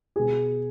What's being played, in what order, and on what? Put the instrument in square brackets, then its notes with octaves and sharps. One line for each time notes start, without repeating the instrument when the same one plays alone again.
[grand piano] B2 G#4